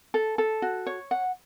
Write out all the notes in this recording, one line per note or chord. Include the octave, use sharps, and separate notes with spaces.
A4
A4
F#4
C#5
F#5